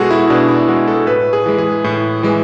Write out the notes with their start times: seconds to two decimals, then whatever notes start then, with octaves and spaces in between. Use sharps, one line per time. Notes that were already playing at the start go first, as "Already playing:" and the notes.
Already playing: B2 G#3 F#4 G#4 A4
0.11 E4
0.30 B2 D4
0.48 E4
0.68 G#3 F#4
0.88 A4
1.07 A2 B4
1.33 G#4
1.46 E3 G#3
1.58 G#4
1.84 A2
2.23 E3 G#3